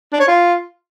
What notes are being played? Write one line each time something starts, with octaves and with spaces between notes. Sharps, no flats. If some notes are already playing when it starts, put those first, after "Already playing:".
D4
C#5
F4